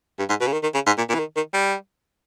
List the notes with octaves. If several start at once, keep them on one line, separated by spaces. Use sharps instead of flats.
G2
G#2
B2
C#3
D#3
D#3
C#3
G#2
A#2
A#2
E3
D#3
D#3
G3